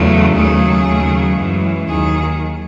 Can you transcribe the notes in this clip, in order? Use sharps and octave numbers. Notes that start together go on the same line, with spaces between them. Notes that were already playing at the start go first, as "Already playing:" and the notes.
Already playing: E2 C#3 F#3 A3
D#2 C#3 F#3 A3 G#4
D#2 C#3 F#3 A3
F#2 E3 G#3
D#2 D#3 F#3 G#4